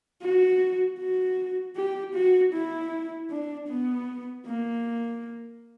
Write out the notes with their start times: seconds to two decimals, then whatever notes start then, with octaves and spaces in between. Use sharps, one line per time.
0.22 F#4
0.99 F#4
1.77 G4
2.15 F#4
2.54 E4
3.31 D4
3.69 B3
4.46 A#3